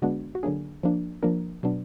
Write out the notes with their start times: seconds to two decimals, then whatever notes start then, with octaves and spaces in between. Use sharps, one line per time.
0.02 D3 G#3 B3 D4 F#4
0.35 F#4
0.43 D3 F#3 A#3 D4 G#4
0.83 F3 A#3 D4
1.23 F3 A#3 D4 A#4
1.63 B2 F#3 B3 D4